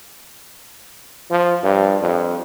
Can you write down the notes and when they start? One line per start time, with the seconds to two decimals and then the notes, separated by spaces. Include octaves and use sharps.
1.30 F3
1.63 G2
2.01 F2